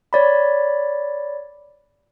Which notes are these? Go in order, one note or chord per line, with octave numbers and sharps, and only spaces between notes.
C#5 D5 B5